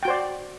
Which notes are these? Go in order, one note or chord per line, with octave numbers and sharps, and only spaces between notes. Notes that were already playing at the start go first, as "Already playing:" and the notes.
F#4 C5 D5 G5